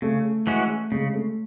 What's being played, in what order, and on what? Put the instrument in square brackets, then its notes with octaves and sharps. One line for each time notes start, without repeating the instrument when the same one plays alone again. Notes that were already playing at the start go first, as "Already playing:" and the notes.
[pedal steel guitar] C#3 [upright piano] A3
[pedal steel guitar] E3 G#3 C#4 F#4
[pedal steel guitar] C#3 [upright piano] G#3
[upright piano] A3